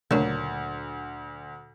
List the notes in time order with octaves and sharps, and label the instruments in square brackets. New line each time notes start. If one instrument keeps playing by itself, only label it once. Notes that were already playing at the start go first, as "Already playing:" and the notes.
[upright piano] D2 [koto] A#2 F#3 [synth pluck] C#3 A3 D4